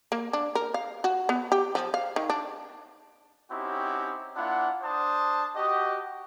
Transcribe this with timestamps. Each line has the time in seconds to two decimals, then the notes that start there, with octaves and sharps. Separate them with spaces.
0.12 A#3
0.33 D4
0.55 A#4
0.74 F5
1.04 F#4
1.29 B3
1.52 G4
1.75 F3
1.94 F5
2.16 D#3
2.30 D4
3.50 C4 C#4 D#4 E4 F#4 G4
4.36 A#3 D4 E4 F4 F#5
4.82 D4 C5 A5 D#6
5.56 F#4 G4 D#5